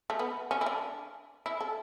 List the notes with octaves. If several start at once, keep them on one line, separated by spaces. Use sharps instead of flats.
A3
B3
C#4
E4
D4
E4
A4